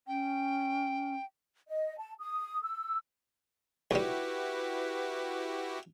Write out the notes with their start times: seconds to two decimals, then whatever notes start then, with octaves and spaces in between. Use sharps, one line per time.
0.07 C#4 G5
1.68 D#5
1.98 A5
2.21 D#6
2.62 E6
3.91 B1 G3 E4 F#4 G4 B4